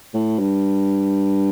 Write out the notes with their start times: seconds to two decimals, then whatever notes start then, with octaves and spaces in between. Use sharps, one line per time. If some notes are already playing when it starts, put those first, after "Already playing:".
0.14 A2
0.39 G2